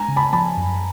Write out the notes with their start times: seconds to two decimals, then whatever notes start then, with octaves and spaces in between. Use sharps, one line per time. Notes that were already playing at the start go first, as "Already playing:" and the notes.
Already playing: G#3 G#5 A#5
0.08 C#3
0.16 A5 B5
0.33 F3 A5 B5
0.57 F#2